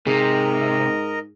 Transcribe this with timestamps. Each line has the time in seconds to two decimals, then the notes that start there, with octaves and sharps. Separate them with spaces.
0.07 G#2 C3 G#4 A#4 D#5